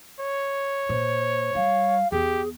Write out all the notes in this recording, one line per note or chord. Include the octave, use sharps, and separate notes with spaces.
C#5
A#2 C5
G3 F5
E2 G4 G#4